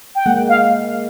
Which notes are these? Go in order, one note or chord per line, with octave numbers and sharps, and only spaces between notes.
G5
G#3 A#3 F#5
F5